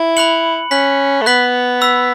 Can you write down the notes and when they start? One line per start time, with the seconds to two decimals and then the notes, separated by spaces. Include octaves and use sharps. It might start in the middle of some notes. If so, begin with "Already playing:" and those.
Already playing: E4
0.17 B5 F#6 C#7 F#7
0.71 C#4 F#6 B6 F#7
1.21 A3
1.26 B3 F#6 B6 F#7
1.81 B5 E6 B6